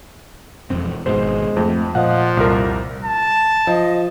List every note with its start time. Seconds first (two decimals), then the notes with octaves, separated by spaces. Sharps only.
0.70 E1 F2 C4
1.06 G#1 G#2 B2 G#3 C5
1.57 F2 A3 C4
1.95 A#2 F3 D#5 F5 F#5
2.37 C2 F2 A#4
3.05 A5
3.67 F3 D#5